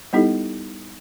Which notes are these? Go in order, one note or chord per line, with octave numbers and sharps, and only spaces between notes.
G3 B3 D#4 E4 G4 A4